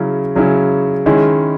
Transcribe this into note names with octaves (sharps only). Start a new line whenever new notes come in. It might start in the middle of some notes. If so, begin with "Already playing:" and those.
Already playing: C#3 F#3 C#4 E4
C#3 F#3 C#4 E4
D#3 G#3 C#4 E4